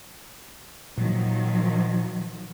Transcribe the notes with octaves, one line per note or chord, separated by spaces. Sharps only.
A#2 D#3 F3 F#3